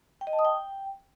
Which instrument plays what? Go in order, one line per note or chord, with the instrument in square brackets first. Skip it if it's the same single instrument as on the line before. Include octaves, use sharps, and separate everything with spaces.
[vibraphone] G5
D#5
A5
D#6
G5